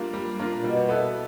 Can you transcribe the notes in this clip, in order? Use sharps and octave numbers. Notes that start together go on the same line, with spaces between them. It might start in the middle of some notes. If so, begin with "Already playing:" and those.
Already playing: G3 A#3 D4 F4
G3
A#3 D4 F4
A#2
B2 G3
B3 E4 A4